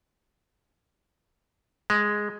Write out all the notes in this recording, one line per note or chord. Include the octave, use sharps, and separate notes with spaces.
G#3